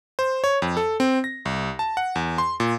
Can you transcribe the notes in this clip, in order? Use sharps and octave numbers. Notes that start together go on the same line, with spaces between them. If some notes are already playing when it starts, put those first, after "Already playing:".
C5
C#5
F2
A4
C4
A#6
C2
A5
F#5
E2
C6
A#2